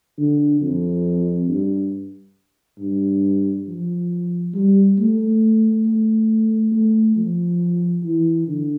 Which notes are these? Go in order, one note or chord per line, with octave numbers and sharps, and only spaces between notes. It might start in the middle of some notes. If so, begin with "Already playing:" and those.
D3
F2
G2
G2
F3
G3
A3
A3
A3
F3
E3
D3